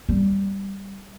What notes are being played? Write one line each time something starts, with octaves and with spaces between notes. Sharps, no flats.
G3